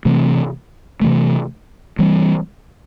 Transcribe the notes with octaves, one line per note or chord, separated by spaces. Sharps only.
C3 E3 A3 C4
C3 E3 A3
E3 G3 C4